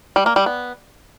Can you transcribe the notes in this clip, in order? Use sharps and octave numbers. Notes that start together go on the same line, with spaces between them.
G3
A#3
G3
B3